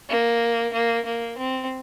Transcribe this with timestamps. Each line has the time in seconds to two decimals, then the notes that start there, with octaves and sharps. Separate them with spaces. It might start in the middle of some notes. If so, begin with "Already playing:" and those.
0.09 A#3
0.73 A#3
1.05 A#3
1.38 C4